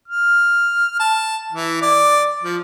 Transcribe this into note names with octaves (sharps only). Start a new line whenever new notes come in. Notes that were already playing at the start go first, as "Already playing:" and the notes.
F6
A5
E3
D5
F3